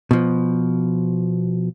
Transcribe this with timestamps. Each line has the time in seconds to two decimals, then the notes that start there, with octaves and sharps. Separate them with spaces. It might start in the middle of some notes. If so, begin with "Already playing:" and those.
0.11 B2 F3